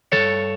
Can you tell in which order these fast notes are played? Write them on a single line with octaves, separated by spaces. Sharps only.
E3 A4 C#5 G2